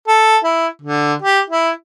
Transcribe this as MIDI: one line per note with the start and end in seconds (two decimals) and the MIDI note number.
0.08 0.37 69
0.44 0.67 64
0.82 1.14 50
1.22 1.40 67
1.50 1.71 64